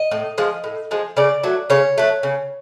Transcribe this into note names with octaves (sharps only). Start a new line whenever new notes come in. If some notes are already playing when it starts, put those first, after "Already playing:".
Already playing: D#5
A2
F3 G#3
A2
F3 G#3
C#3 D5
F#3 A3
C#3 C#5
F#3 A3
C#3